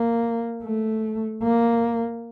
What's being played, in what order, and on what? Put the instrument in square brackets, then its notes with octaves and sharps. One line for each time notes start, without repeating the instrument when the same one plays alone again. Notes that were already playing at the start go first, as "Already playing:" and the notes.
Already playing: [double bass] A#3
A3
A#3